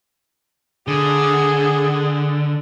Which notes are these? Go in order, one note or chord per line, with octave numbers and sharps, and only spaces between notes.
D3 G#4